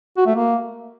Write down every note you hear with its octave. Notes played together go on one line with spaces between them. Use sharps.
F#4
A3
A#3